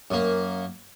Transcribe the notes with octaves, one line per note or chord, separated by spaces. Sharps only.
F#2 A#3